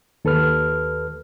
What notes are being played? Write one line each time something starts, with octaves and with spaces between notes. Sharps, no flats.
D#2 A4 B4 F6